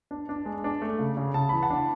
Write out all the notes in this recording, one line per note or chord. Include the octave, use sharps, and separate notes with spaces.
D4
D4
G#3
D4
A3
C#3
C#3
C#3 A5
E3 B5
F#5 A5
D4